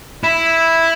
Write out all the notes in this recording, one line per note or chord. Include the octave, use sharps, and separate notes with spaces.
E4